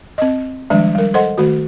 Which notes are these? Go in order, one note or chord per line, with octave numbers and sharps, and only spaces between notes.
C4 D#5
D#3 F3 G3 G#3 D4
G3 A#4
A4 C5 D#5 F#5 C6
D#3 A3 F#4